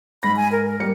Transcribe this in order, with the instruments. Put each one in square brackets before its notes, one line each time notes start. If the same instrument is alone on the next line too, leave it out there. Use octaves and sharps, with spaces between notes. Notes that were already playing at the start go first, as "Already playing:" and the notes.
[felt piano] G#2 A#6 [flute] B5
[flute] G#5
A#4
A#4
[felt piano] G3 A#3 C#7